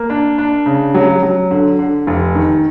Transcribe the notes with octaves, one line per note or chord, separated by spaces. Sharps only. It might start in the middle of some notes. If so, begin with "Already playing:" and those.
Already playing: A#3
D4
D4
C#3
F#3
F#3
D3
D3
F1
D#3